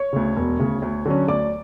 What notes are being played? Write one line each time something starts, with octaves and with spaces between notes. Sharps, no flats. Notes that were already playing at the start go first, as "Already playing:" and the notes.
Already playing: C#5 C#6
D2 C#3
E1
D2 C#3
D2
D3 F#3 C#4
D2 D5 D6